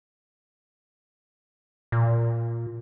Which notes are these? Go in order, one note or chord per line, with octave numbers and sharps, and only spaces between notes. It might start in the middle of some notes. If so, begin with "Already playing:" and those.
A#2